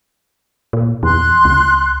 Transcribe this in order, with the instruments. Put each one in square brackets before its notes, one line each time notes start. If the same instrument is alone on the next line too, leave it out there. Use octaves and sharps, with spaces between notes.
[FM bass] A#2
[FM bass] E2 [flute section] C6 F#6
[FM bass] C#2